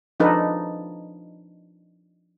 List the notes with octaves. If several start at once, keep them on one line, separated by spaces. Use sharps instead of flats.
F3 D4 D#4 A4 B4